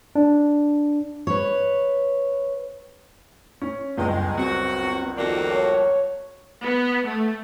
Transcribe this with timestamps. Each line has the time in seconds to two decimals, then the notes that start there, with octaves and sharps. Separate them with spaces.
0.15 D4
1.27 B4 C#5
3.62 C#4
3.98 G1 C#2 F#2 G#3 G5
4.38 F#2 C4 F#4
5.17 F2 D#3 A#3 F#4 D5
5.50 C#5 A5
6.63 B3
7.06 A3